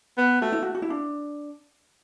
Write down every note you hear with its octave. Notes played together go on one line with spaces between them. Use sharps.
B3
A3 F#4
E4
F#4
F#4
E4
D4